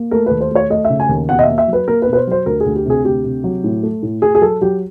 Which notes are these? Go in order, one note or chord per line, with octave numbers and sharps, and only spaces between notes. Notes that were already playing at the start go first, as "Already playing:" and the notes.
Already playing: A#3
A3 A#4
D#2 B4
C5
A3 C#5
A3 D#5
E5
C#3
G#5
D#2
B2 F#5
D#5
A#3 E5
E5
F#3
B4
A#3 A#4
B4
B2
B4
C5
F#3 C5
D2 A#4
G#4
D2
G4
C3 G#4
D2 G4
C3
F#3
A2
A3
A2
A2 G#4
G#4
F#3 A4
F#3 G4